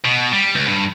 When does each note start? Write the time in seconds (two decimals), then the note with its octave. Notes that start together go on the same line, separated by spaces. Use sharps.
0.05 B2
0.33 G3
0.55 C#2
0.68 G2